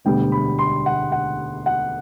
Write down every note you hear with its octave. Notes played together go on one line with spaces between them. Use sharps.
E1 D2 D3 G3 B3 G5
B5
C6
F#5
F#5
F#5